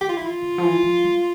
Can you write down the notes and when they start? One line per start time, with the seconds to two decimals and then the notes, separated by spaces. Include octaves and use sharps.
0.01 D3 G4
0.09 F4
0.17 E4
0.21 E3 F4
0.42 D3
0.58 F3
0.63 E3
0.83 F3
1.03 G3